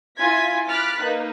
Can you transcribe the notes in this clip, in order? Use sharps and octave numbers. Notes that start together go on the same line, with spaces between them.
E4 F4 G#5 G#6 B6
B5 D6 F6 F#6 A6 B6
A#3 D#4 B4